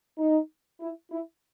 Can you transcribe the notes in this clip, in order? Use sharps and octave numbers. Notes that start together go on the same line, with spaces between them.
D#4
E4
E4